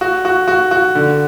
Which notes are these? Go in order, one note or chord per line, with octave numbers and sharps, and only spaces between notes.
F#4
F#4
F#4
F#4
D3